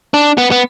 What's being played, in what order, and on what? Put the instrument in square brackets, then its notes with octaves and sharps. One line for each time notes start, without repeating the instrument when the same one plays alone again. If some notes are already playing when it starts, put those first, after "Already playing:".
[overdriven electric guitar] D4
B3
B3